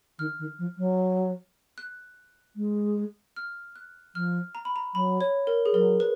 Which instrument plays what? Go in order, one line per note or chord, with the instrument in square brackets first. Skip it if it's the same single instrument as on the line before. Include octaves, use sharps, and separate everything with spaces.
[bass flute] D#3 [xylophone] F6
[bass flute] D#3
F3
F#3
[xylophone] F#6
[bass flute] G#3
[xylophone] F6
F#6
[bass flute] F3 [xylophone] F6
[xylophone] A#5
B5
A#5
[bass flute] F#3 [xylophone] B5
[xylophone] C#5
A#4
G#4
[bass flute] F#3 [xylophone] A#4
[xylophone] B4